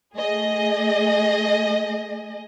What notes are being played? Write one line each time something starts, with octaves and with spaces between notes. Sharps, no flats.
A3 G#4 D#5